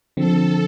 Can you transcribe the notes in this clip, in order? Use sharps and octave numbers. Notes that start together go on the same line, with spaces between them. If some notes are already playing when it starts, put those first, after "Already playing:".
D3 F3 C4 A4